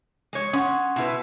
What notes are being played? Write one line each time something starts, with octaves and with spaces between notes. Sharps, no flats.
G#3 C#5
C#4 F#5 C6 D#6
B2 E4 B4